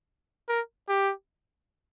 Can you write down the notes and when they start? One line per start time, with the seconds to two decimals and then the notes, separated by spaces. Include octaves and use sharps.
0.48 A#4
0.88 G4